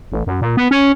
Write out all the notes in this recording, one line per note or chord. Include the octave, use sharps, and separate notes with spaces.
A1
F#2
A#2
B3
C#4